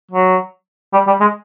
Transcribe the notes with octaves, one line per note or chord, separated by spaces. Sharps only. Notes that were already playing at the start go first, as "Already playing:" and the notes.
F#3
G3
G3
G#3